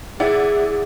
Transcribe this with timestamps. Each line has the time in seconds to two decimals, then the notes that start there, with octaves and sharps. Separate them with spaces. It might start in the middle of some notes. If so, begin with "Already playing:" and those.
0.20 E4 G#4 D5 F#5